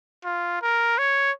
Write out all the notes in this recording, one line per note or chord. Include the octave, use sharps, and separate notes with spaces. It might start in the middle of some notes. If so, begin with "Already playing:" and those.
F4
A#4
C#5